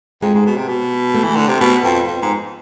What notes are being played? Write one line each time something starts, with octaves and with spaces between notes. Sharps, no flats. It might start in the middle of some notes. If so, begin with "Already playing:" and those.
F2 G#3
G#2
B2
C3
B2
A3
E3
D3
C3
B2 B3
F2
F2
G#2